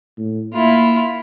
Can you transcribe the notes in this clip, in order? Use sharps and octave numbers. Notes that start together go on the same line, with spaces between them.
A2
A#3 E4 F4